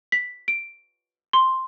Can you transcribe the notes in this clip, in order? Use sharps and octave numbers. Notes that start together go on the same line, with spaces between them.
B6
D7
C6